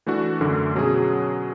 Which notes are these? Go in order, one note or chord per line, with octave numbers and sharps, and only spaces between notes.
E3 A3 D4 F#4
F#2 D3 A3 D4
B2 F#3 C#4 G#4